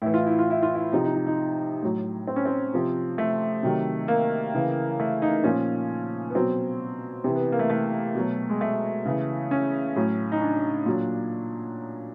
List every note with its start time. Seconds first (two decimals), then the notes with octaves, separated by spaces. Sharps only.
0.02 A2 E3 E4
0.14 F4
0.27 E4
0.39 F4
0.51 E4
0.63 F4
0.74 E4
0.92 C3 F3 D#4
1.04 D#4
1.15 D#4
1.27 D#4
1.82 A2 F#3
2.27 C4
2.36 C#4
2.45 C4
2.74 C3 F3
3.18 A3
3.63 C3 D#3 F#3
4.08 A#3
4.54 C#3 E3
5.00 A3
5.22 D#4
5.44 A#2 F3 C#4
6.30 B3
6.35 B2 F#3 C4
7.24 C3 E3
7.36 B3
7.52 A#3
7.59 A3
7.70 A3
8.15 B2 F#3
8.50 G#3
8.61 A3
9.05 C#3 E3
9.51 C#4
9.96 A2 F#3
10.32 D#4
10.42 D4
10.86 A#2 F#3